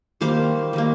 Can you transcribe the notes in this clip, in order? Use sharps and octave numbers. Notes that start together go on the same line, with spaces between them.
D#3 G3 A#3 C5 F5
D#3 G3 A#3